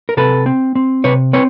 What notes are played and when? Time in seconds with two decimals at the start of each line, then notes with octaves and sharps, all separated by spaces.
0.09 A#4
0.17 C3 A4 B4
0.46 C4
0.75 C4
1.04 C3 B4 C#5
1.33 C4 B4 C#5